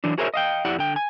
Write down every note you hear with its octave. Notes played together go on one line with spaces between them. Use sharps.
E3 F#3 D4
F#4 G#4 A#4 C5 C#5 E5
D#5 F5 G5
F2 E4 G4 D5 F#5
D3 G5
G#5